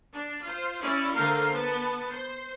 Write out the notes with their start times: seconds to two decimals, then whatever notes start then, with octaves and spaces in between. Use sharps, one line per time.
0.14 D4
0.43 F4 C5
0.81 C#4 E4 D5
1.13 D3 A3 A#4 C5 F5
1.52 B3 A5
2.09 C5